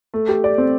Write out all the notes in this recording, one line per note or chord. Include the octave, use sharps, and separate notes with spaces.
A3
G4
D5
C4